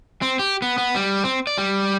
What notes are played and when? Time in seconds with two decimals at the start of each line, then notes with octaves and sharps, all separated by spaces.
0.22 C4
0.39 G4
0.62 B3
0.78 B3
0.96 G3
1.24 C4
1.47 D5
1.58 G3